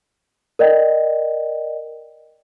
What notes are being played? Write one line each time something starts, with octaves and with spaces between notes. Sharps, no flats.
A#4 D5 D#5 G5